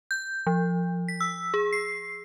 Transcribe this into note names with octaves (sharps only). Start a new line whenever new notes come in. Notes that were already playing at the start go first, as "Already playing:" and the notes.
G6
F3
B6
E6
G#4
C7